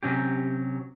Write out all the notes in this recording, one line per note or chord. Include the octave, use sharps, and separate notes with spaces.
C3 F#3 C#4 G4